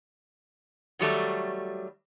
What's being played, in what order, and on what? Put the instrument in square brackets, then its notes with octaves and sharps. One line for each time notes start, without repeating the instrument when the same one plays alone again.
[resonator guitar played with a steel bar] D#3 F#3 G3 A3